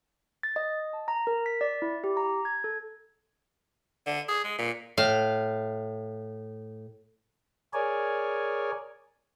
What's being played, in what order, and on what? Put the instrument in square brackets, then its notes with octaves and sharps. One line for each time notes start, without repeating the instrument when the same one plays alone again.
[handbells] A6
D#5
A5
A#5
A#4
B6
D5
E4
G4
A#5
G#6
A4
[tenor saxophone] D3
G#4
G#3
A#2
[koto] A2 F5
[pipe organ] G#4 A#4 C#5 D5 G#5